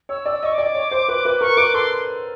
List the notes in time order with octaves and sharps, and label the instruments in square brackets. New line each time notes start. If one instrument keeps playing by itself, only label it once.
[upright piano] C#5 [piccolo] E6
[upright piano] D5
[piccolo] E6
[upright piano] D#5 [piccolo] C#6
[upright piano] D5 [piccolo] D6
[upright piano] C#5
C5
B4
B4
[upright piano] A#4 [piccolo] C#6
[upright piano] B4 [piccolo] D6
[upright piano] A4 [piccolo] C6